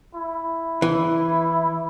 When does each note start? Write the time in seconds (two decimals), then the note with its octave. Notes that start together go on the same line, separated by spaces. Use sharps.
0.15 E4
0.82 E3